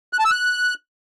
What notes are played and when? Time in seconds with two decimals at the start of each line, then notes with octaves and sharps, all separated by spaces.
0.13 F#6
0.19 A5
0.25 E6
0.31 F#6